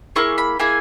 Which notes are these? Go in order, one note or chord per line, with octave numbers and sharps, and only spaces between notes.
A#3 E4 G#4 C#6
B5
A#3 E4 G#4 G#5